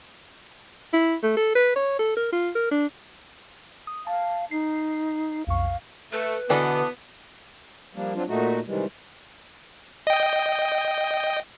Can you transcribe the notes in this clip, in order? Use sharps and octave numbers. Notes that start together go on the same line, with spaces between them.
E4
A3
A4
B4
C#5
A4
A#4
F4
A#4
D4
D#6
F5 A5
D#4 C7
B1 F2 F5 C#6
A3 B4
B2 D3 E3 B3 D4 A4
F3 G3 A#3 D4
F#3 C4 D4 F4
A#2 A3 D#4 F#4
C3 D#3 E3 G3 G#3
D#5 G5